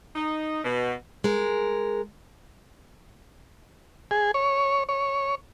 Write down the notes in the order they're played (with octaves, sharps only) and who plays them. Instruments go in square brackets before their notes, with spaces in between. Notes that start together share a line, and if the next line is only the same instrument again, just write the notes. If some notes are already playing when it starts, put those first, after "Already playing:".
[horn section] D#4
B2
[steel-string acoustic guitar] G#3 A#4
[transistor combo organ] G#4
C#5
C#5